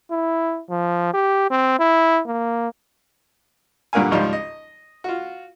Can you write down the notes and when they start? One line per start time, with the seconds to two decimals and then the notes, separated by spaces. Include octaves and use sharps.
0.11 E4
0.70 F3
1.14 G4
1.51 C4
1.79 E4
2.27 A#3
3.93 G2 A#2 D3 A#4 F5 G#5
4.11 G#1 C#2 D#3 F3 G3 F5
4.33 D#5
5.04 F4 F#4